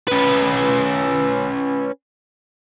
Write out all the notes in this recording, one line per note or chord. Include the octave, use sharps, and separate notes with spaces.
C#4 B4